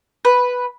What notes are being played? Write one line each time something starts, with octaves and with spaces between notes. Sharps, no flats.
B4